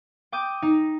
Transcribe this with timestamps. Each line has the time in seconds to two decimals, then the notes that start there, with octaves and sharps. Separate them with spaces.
0.32 G5 D6 D#6 G6
0.62 D#4